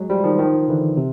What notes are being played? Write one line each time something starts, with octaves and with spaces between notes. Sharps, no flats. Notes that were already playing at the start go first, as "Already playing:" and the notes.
Already playing: F#3 G#3
F3 G3
D#3 F3
D#3 F3
D3 E3
C3